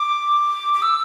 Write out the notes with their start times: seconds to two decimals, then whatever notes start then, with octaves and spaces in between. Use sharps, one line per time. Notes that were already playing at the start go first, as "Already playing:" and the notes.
Already playing: D6
0.73 D6
0.82 E6